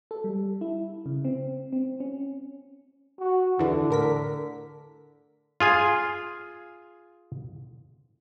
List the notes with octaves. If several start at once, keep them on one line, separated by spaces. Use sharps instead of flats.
A4
G3
E4
C#3
C4
C4
C#4
F#4
E2 D3 E3
A2 A#4 B6
F4 G#4 G#5